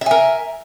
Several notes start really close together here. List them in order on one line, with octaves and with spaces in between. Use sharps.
E5 G#5 A#4